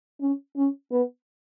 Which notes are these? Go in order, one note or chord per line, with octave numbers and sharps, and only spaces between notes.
C#4
C#4
B3